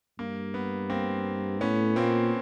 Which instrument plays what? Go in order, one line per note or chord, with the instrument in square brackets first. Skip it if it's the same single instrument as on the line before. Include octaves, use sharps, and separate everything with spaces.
[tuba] G2 [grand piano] A#3
[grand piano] B3
A#3 C4
[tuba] A2 [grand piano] B3 C#4
[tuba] A#2 [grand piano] A#3 C4